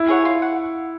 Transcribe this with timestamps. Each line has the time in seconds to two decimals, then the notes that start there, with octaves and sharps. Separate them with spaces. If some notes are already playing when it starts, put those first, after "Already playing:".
Already playing: E4
0.08 G#4 C#5 F#5
0.25 F4
0.42 F#5